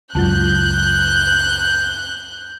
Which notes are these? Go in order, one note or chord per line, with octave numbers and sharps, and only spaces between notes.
C#2 F#2 F#3 F4 A5 F#6 G6